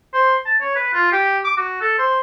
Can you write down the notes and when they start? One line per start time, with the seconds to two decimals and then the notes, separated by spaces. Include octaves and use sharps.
0.14 C5
0.45 A5
0.60 C#5
0.75 B4
0.93 F4
1.12 G4
1.44 D6
1.57 F#4
1.80 A4
1.98 C5